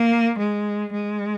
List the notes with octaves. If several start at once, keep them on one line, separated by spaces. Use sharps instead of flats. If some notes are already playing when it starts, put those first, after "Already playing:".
Already playing: A#3
G#3
G#3